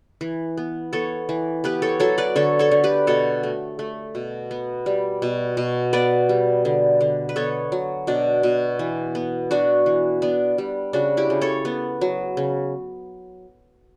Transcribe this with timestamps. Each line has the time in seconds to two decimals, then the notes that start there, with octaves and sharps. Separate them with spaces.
0.21 E3
0.57 B3
0.93 B3 A4 C#5
1.29 E3
1.64 B3 G4 B4
1.82 A4 C#5
2.00 F#3 A4 C#5
2.18 B4 D5
2.36 D3 A4 C#5
2.59 A4 C#5
2.71 D3
2.84 G4 B4
3.07 B2 A4 C#5
3.43 A3
3.79 A3
4.15 B2
4.51 B3
4.86 G3
5.22 B2
5.57 B2
5.93 B3 B4 D5
6.29 G3
6.65 D3
7.01 D3
7.29 B4
7.36 B3 A4 C#5
7.72 F#3
8.07 B2 D4
8.43 B2
8.79 E3
9.15 B3
9.51 B3 D4 F#4
9.86 E3
10.22 B3 D4
10.58 G3
10.93 C#3 D4 F#4
11.17 E4 G4
11.30 C#3
11.41 A4 C#5
11.65 B3
12.01 F#3
12.37 C#3